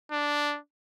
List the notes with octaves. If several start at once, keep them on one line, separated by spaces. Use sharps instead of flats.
D4